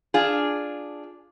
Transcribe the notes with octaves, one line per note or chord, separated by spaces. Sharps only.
D4 F4 G#4